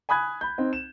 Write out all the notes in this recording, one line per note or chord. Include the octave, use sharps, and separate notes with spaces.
G#5 B5 D#6 F#6 G#6
B5 G6
C4 D#4
E7